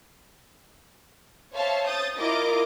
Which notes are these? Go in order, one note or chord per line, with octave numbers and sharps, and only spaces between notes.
C5 C#5 E5 F5 A5
D#6 G6 A6
E4 F4 A#4 D#5 D6